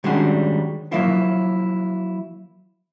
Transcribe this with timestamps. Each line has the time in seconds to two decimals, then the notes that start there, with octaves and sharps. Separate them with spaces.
0.04 D#3 G3 G#3 C#4 D4 F#4
0.92 F3 F#3 A#3 E4 F4